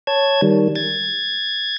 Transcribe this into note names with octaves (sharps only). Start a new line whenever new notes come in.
C#5 A5 G#6
D#3 G3
G#6 A6